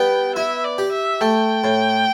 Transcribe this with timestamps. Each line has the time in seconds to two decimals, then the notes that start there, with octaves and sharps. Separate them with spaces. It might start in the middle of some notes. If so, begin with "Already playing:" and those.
Already playing: G3 B3 G5
0.36 E4 E5
0.64 D5
0.78 G4
0.92 E5
1.21 A3 G5
1.64 A2